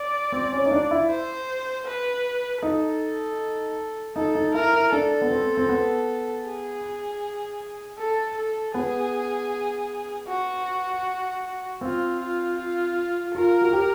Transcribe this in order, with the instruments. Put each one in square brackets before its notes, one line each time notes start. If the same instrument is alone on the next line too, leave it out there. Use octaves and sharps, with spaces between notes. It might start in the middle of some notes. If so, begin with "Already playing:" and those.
Already playing: [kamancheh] D5
[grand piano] C4
C#4
D#4
D4
E4
[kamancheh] C5
B4
[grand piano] D#4 [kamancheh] A4
[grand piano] D#4 [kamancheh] A4
[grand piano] D#4
[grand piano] E4 [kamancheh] A#4
[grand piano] E4
[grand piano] D4 [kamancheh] A4
[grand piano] B3
C4
C4
B3
[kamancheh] G#4
A4
A4
[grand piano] B3 [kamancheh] G#4
[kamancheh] F#4
[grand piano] C4 [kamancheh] F4
[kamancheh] F4
F4
[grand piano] F4 [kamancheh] A#4
[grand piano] F#4
G4